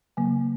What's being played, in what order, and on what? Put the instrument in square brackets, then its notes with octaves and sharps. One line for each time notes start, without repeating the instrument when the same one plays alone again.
[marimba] C#3 F#3 A#3 G#5